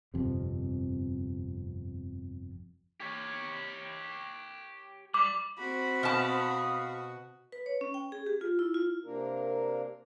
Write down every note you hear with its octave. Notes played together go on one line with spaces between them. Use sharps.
G1 F2 C3
G4 C#5
G3 D6
C4 F#4 B5
B2 F5 A5 D#6
B4
C#5
C#4
G5
G#4
G4
F4
E4
F4
C3 A#3 D4 A#4